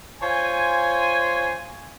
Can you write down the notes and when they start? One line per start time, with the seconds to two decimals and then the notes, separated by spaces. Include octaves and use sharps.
0.22 F4 C5 C#5 G#5